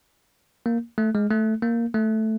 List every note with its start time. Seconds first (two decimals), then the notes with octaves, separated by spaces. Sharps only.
0.66 A#3
0.98 A3
1.15 G#3
1.31 A3
1.63 A#3
1.94 A3